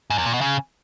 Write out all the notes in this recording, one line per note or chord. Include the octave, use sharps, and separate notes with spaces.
G#2
E2
A#2
B2
C#3